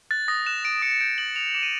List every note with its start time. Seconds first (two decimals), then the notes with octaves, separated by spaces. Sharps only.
0.11 F#6 A6
0.28 D#6 A#6
0.46 F#6 E7
0.64 F#6 D7
0.82 D#6 C#7
0.92 C#7
1.00 G6 D7
1.18 D#6 F#7
1.36 D#6 F7
1.54 D6 E7
1.63 D#7